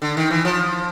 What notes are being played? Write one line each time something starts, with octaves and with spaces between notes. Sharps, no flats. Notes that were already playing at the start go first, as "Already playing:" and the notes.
D3
D#3
E3
F3